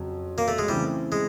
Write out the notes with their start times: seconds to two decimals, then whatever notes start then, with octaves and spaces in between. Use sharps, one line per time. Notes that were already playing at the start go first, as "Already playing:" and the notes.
Already playing: F2 C#3 F#3
0.38 A#3
0.48 A3
0.59 G#3
0.68 C#3 E3 G3 A3 C4 E4
1.12 G#3